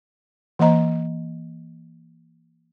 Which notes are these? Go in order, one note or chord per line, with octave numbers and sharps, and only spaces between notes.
E3 A#3 C5 D#5 A#5